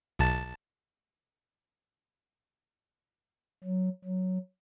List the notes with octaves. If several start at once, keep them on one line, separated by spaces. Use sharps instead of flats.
B1 A5
F#3
F#3